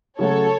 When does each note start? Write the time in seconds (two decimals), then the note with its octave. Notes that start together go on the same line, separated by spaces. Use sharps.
0.19 C#3 F#3 A3 F#4 A4 C#5